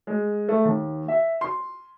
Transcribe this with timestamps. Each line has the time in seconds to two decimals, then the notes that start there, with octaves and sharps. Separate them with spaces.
0.07 G#3
0.49 A3
0.65 D#2
1.08 E5
1.41 C6